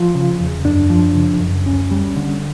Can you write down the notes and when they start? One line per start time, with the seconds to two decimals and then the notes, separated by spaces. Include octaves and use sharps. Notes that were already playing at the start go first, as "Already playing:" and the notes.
Already playing: F3 F4
0.15 C#3
0.40 E2
0.65 F#2 D4
0.90 F3
1.15 C#3
1.41 F#2
1.66 D2 C#4
1.91 G3
2.16 D3